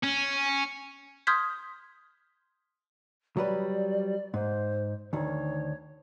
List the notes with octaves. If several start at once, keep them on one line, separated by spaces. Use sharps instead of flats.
C#4
C6 D#6 F6 G6 G#6 B6
F#3 G3 B4 D5
G#2 C5
D2 D#3 C#5